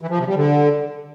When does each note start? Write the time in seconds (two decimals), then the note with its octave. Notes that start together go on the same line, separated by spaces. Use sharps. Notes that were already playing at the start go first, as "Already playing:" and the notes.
0.01 E3
0.10 F3
0.19 C3
0.27 G3
0.36 D3